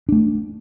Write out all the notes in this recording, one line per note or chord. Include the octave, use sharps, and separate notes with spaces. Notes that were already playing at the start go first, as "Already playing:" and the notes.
A3 D4